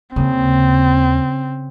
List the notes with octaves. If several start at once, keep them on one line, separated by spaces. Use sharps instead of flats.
D#2 C#3 A#3 C4